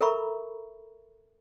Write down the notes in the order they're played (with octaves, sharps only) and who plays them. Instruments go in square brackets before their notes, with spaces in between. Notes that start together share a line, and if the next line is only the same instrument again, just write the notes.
[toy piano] A4 A#4 E5 A#5 B5 C#6